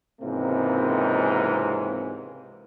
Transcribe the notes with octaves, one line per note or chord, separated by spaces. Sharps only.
C#2 G#2 C3 E3 A#3 C4